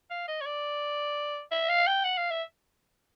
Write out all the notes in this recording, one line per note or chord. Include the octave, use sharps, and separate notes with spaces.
F5
D#5
C#5
D5
E5
F5
G5
F#5
F5
E5